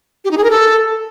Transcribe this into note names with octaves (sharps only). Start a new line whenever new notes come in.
G4
D#4
G#4
A#4
A4